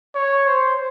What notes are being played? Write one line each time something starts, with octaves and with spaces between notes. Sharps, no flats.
C#5
C5